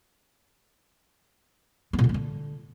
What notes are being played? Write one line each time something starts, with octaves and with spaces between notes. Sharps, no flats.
B3
A#2
D3
A#3
D3